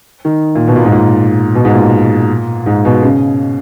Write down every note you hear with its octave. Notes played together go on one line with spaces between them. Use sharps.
D#3
A#2
B2
A#2
G#2
A#2
B2
G#2
A#2
G#2
B2
C#3